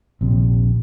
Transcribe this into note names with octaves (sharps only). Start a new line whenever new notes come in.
A#1 D#2 C3